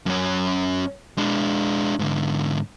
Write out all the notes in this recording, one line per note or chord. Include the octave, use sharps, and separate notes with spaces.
F#2 C#4
G#3 D4
G#2 D3